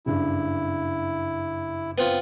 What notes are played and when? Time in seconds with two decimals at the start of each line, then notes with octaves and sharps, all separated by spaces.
0.06 F#1 G2 E4
1.98 B3 C4 F4